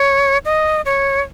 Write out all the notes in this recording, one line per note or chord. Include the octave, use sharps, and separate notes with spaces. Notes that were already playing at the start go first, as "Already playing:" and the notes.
Already playing: C#5
D#5
C#5